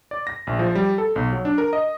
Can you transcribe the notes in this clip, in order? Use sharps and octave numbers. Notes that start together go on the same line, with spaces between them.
D5
A#6
A#1
F3
G3
A4
B1
F#3
D4
A#4
D#5